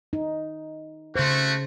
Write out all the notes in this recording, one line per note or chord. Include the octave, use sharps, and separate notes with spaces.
D#4
C#3 A3 F#4 C5